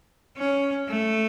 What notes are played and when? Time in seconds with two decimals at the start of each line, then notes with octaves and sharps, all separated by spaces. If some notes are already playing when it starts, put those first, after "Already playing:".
0.38 C#4
0.88 A3